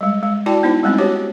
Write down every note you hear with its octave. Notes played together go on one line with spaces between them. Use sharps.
G3 G#3
G#3
E4 F#4 D5 G5 A5
B3 D#4 E4 C5
G3 G#3 A#3 C4 D#4
C#4 F#4 G4 C5 C#5